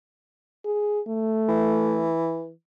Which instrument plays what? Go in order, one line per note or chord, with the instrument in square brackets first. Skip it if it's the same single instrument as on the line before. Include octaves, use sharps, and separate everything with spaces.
[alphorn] G#4
A3
[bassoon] E3